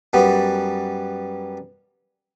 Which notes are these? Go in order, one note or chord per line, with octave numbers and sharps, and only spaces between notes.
F#2 G3 B3